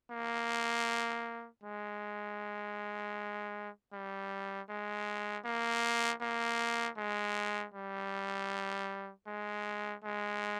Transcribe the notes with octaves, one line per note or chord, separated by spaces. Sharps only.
A#3
G#3
G3
G#3
A#3
A#3
G#3
G3
G#3
G#3